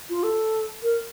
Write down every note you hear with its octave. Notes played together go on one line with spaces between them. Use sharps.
F4
A4
A#4